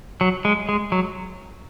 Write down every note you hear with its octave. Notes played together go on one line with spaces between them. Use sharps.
F#3
G#3
G#3
F#3